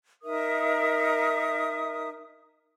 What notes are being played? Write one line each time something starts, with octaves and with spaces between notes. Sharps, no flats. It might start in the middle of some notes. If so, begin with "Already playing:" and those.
D#4 A#4 E5 D#6